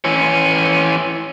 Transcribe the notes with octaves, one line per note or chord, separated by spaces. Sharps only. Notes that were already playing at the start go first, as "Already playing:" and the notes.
E3 C#4